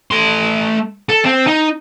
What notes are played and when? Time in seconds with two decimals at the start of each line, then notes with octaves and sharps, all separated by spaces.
0.11 A3 C6
1.09 A4
1.24 C4
1.47 D#4